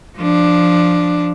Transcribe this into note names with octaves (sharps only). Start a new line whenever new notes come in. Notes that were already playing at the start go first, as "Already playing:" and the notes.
F3 D4